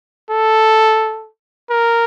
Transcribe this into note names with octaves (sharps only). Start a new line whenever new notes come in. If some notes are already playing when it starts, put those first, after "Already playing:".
A4
A#4